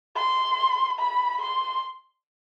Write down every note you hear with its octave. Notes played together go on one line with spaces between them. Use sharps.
C6
B5
C6